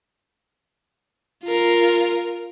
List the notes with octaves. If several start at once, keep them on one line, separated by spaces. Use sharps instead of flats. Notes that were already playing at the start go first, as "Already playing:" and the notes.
F4 A#4